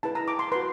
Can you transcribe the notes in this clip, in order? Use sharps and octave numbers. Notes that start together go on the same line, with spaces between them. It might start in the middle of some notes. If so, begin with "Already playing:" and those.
E4 G#4 B4 A5
A#5
D6
C6
F#4 B4 C6